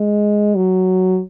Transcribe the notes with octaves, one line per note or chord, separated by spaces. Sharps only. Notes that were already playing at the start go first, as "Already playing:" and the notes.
Already playing: G#3
F#3